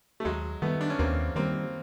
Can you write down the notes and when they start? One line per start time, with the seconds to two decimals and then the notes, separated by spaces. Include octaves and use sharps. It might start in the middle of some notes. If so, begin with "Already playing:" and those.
0.20 A3
0.25 D#2 F#3 G#3
0.62 D#3 G3 A3 B3
0.81 D4
0.90 C#4
0.99 D#2 A#3 C4
1.35 D#3 G3 A#3 C4